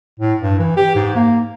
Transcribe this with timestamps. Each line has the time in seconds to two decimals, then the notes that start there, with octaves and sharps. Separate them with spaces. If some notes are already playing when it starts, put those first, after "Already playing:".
0.20 A2
0.41 G2
0.59 E3
0.76 G4
0.96 G#2
1.15 A#3